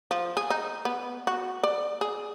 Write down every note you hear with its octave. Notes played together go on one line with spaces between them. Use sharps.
F3
G#4
D#4
B3
F#4
D5
G#4